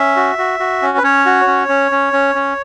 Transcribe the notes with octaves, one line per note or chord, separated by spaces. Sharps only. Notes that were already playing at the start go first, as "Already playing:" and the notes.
Already playing: C#4 E5
F#4
F#4
F#4
C#4
B4
C#4 C#5
F#4
C#4
C#4
C#4
C#4
C#4